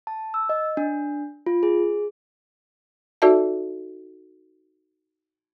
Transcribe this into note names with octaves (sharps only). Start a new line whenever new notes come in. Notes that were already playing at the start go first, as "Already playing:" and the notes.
A5
E6
D#5
D4
F4
G#4
D#4 F#4 A4 D5 E5 A5